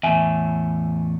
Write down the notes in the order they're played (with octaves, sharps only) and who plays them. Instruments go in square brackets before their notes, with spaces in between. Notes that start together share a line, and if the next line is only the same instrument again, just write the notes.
[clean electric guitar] E2 A2 [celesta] E5 G#5